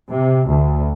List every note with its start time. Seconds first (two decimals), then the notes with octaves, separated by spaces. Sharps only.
0.10 C3
0.49 D2